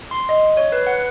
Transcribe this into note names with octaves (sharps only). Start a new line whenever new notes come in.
C6
D#5
C#5
B4
F#5